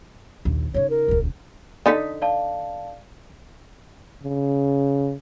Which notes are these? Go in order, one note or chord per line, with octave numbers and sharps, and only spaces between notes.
A#1 D#2
C#3 D#4 C#5
A#4
D#1 C#2
D3 D#4 A4 D#6 B6
D5 F5 A5
C#3